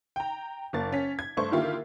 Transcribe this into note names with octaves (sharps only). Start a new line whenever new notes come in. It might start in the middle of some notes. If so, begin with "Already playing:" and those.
G5 A#5
F#1 A#3 A6
C#4 B6
G#6
G2 A3 D4 C5 C#6
D3 D#3 A#3 E4 F4 G4